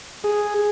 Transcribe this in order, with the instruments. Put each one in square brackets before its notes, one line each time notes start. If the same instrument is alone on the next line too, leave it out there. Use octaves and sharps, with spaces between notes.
[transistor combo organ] G#4